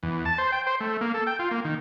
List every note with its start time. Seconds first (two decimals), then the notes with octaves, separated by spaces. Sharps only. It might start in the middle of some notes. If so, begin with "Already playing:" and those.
0.03 E2
0.25 A5
0.38 C5
0.52 G5
0.67 C5
0.81 A3
1.01 A#3
1.14 A4
1.27 G5
1.39 F4
1.51 A#3
1.64 D#3